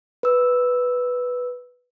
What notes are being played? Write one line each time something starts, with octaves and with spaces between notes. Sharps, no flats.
B4 E6